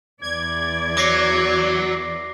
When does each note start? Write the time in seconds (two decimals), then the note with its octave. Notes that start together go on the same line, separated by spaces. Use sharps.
0.22 E2 D5 G#6
0.97 F#3 D6 A#6 C7